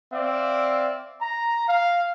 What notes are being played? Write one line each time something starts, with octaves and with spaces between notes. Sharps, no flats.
C4 D5 E5 F5
A#5
F5